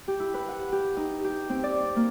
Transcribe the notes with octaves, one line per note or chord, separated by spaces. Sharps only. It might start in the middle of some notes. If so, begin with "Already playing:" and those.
G4
E4
B4
F#5
G4
D#4
G4
C4
D5
A#3